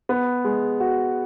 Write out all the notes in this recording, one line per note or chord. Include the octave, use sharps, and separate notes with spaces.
B3
G#3
F#4